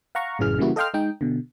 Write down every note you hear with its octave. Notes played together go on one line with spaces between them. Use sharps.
F5 F#5 A#5 C#6
A1 F#2 C#3 E3 G#4 F6
C#3 E3 G3 A#3 E4 F#4
A4 D#5 F5 G5 C6 F6
G#3 D#4 G5
B2 D3